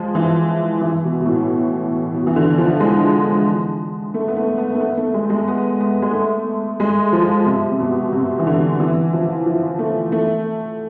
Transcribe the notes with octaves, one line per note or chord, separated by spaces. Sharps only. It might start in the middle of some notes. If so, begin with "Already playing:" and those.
Already playing: F3 G#3
E3
E3
B2
B2
A2
B2
E3
D3
F3
G#3
A3
B3
A3
B3
A3
B3
A3
G#3
G#3
B3
B3
G#3
A3
G#3
F3
C3
C3
B2
C3
E3
D3
E3
F3
F3
A3
A3